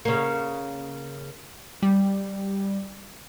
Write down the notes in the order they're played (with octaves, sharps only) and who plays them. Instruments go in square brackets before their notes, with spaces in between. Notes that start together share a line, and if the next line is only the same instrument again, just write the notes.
[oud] C#3 A#3
[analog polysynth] G3